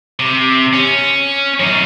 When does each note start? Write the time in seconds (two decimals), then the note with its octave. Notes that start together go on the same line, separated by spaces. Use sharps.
0.19 C3
0.73 C#4
1.60 F#2 D#4